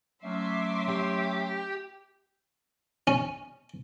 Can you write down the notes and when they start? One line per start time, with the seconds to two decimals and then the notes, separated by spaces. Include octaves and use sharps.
0.23 F#3 A3 C#4 E5 C6 D6
0.89 G4
3.07 C#4